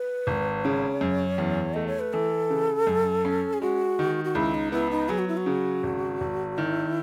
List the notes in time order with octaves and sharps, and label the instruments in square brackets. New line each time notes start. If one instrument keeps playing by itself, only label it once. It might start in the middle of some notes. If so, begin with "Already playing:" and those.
Already playing: [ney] B4
[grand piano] G#1
[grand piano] C#3 [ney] C#5
[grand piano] F#2
E2
[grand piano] A3 [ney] D#5
[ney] C#5
B4
[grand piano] E3 [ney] A4
[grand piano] C#3
F#2
C#4
[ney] G#4
[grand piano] G#3 [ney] F#4
[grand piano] D#3
[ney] F#4
[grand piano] C#2 [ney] E4
[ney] D#4
[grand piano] B3 [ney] E4
[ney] D#4
[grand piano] F#3 [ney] G#4
[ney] F#4
E4
F#4
[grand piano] C#3
G#1
G#1
[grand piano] D#3 [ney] E4